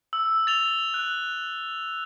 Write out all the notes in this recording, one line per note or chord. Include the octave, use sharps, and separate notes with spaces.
E6
A6 F7 G7
F#6